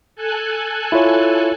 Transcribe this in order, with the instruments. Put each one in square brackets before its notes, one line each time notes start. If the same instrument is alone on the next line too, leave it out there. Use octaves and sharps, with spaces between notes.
[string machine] A4 G#5 F#6
[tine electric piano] E4 F4 C#5